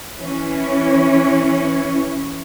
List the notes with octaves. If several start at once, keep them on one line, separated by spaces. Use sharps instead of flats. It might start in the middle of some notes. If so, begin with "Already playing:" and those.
E3 C#4